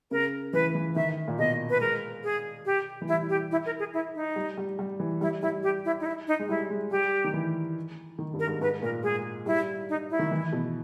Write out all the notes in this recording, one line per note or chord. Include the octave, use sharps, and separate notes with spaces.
C#3 A#4
E3 B4
E3
D#3 E5
A#2
B2 D#5
B4
G#3 A#4
G#4
G4
E3
G3 E4
G4
E4
A#4
G#4
E4
D#4
G3
G3
G3
E3
G3 E4
G3 E4
G4
E4
D#4
E4
D#4
G#3
G3 E4
G#3
G3 G4
D#3
E3
D#3
G2
A#4
G#2
G#2 B4
A#2 A#4
G#3 G#4
G3 E4
D#4
E4
D#3
E3
B2